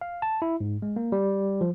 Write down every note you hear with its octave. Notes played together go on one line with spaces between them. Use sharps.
F5
A5
E4
G#2
G#3
A#3
G3
F3